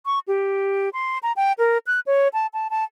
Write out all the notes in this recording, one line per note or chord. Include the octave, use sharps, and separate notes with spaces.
C#6
G4
C6
A#5
G5
A#4
F#6
C#5
A5
A5
A5